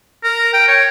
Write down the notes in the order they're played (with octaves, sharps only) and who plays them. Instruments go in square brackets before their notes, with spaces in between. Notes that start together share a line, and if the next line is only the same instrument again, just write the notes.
[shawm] A#4
G5
C#5